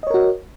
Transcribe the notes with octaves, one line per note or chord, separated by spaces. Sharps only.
F#4 A#4 C#5 D#5